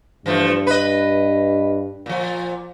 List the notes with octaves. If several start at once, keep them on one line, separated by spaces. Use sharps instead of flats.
G2 E3 F3 A3
B4 D#5
A#2 F3